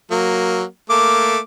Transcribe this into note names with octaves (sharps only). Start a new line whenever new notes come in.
F#3 A#3
A3 A#3 D6